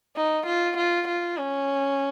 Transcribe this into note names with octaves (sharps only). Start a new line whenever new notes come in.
D#4
F4
F4
F4
C#4